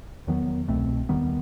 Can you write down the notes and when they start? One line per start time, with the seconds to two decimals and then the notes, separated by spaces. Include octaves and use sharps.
0.27 E2 D#3 F#3 B3
0.68 C2 B2 A3 C4
1.09 D#2 D#3 G3 B3